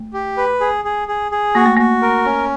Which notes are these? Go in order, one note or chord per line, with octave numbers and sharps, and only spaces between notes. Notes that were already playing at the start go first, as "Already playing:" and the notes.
Already playing: A3
G4
B4
G#4
G#4
G#4
G#4
A#3 F#4
A3
A#3 F#4
A#4
C#4